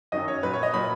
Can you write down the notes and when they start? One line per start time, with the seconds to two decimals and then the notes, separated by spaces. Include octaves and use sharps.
0.12 F#2 D#3 F#3 D#5
0.28 C#5
0.43 A#2 F#3 B4
0.54 C#5
0.63 D#5
0.74 A#2 F#3 B5